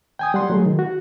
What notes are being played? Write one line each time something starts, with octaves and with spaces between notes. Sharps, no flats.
G5 G#5 D#6
G3 F#5 C6
F#3 A3 G#4
D#3
F#4